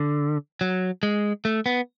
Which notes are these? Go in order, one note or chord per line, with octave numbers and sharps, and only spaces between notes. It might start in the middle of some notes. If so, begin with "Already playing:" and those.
Already playing: D3
F#3
G#3
A3
B3